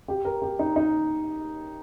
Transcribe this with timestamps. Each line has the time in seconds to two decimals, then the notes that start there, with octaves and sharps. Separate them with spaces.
0.08 G4
0.25 A#4
0.42 G4
0.59 D#4
0.76 D#4